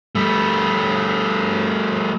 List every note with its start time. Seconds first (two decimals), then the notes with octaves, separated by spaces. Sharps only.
0.15 G3 A3